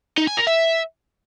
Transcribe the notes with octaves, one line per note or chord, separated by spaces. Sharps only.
D#4
G#5
A#4
E5